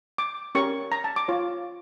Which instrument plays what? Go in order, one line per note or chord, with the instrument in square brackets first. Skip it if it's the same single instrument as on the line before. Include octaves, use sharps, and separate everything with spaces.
[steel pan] D6
C#4 G4 A#4 C#6
A#5
A5
D6
F4 C#5